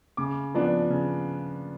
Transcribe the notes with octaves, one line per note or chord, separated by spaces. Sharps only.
C#3 D6
F3 B3 D4
C#3